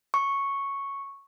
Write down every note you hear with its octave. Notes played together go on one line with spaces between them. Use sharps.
C#6